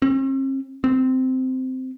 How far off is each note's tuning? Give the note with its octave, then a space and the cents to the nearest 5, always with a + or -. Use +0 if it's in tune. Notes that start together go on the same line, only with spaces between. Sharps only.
C4 +45
C4 -15